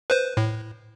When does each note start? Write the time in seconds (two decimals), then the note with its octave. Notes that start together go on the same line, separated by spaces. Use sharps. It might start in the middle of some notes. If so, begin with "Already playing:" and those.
0.10 B4 C5
0.37 A2